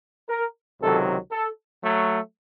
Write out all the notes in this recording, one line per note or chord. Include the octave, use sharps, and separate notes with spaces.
A#4
C#2 C3 D#3 F#3 A4
A4
F#3 A3